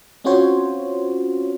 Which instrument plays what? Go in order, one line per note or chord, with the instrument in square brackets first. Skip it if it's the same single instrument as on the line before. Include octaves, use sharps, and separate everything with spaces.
[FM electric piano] C4 C#4 F4 F#4 C5 C#5